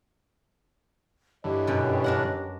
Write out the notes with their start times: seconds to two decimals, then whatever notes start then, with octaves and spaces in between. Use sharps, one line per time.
1.44 G2 D3 E3 G4 C#5 D#5
1.67 F#2 B2
2.04 D4 A#4 F#5